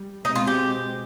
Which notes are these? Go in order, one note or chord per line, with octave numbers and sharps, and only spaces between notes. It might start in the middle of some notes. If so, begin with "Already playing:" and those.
Already playing: G3
B2 G#3 C4 D#4
F4
G4